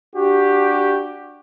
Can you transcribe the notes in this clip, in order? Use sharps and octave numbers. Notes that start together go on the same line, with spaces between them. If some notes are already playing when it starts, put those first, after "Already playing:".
D4 F#4 G4